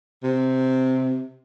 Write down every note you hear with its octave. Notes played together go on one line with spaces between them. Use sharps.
C3